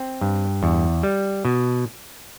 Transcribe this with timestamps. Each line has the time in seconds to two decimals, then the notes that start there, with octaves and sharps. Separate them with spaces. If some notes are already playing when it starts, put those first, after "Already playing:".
Already playing: C4
0.21 G2
0.63 E2
1.03 G3
1.45 B2